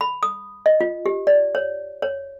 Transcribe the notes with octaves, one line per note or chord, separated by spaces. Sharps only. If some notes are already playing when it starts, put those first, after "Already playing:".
B5
D#6
D#5
F4
G4
D5
C#5
C#5